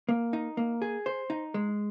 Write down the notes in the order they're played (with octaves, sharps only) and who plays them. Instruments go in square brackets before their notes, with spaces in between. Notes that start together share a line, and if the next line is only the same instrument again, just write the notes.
[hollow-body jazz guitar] A#3
D#4
A#3
G#4
C5
D#4
G#3